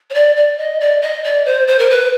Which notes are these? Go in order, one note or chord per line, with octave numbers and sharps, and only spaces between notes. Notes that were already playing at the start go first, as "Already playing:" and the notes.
C#5
D5
D5
D#5
D5
D#5
D5
C5
C5
A#4
B4